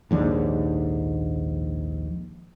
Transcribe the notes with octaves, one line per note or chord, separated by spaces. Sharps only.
A#1 D#2 G#2 D4